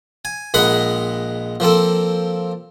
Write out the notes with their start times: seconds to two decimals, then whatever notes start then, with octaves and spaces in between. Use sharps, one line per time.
0.25 G#5
0.54 A#1 G#3 A#4 D#5 F#5 B5
1.60 F3 A#3 C4 A4